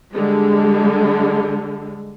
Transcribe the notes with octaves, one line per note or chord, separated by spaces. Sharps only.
D3 G3 G#3